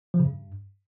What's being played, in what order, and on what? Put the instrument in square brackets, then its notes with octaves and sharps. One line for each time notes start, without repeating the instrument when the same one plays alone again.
[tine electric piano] F3
C#3
G2